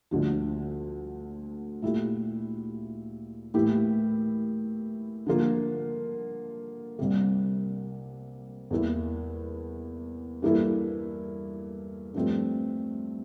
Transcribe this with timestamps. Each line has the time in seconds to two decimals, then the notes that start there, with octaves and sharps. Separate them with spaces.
0.11 D2 D3 F3
1.82 A#2 A3 E4 G4
3.54 A2 E3 A#3 E4 G4
5.27 D3 F3 A#3 F4
6.99 C2 C3 G3 A#3
8.71 E2 E3 A#3 E4
10.42 G2 E3 A#3 E4 A4
12.14 G2 F3 A3 C4